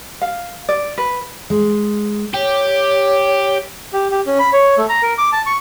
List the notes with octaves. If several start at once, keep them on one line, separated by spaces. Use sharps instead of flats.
F5
D5
B4
G#3
G4 C#5
G4
G4
C#4
B5
C#5
A3
A#5
A#4
D6
A5
C#6